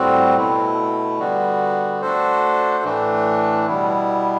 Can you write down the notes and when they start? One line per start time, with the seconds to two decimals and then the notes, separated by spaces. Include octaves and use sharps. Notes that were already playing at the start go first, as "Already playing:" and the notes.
Already playing: A2 G3 C4 F#4
0.37 B2 A3 E4
1.19 D3 G3 B3 F#4
2.02 A3 D4 F#4 A4 C5
2.84 A2 E3 A3 D4
3.66 B2 G3 B3 E4